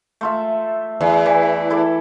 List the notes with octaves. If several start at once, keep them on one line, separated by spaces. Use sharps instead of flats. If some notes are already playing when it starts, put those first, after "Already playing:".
A3 F4 E5
E2
E3
E4 A4 D5